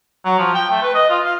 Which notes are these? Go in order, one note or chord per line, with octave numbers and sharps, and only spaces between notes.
F#3
F3
G5
A3
B4
D#5
F4
F5